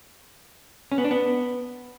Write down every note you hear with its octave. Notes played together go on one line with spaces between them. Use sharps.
C#4
B3
D4
B3